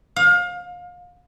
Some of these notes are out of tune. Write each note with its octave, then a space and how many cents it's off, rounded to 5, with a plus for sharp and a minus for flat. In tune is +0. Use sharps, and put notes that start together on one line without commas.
F5 +30